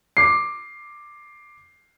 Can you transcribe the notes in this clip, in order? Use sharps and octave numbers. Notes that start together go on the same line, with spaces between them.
D6 C7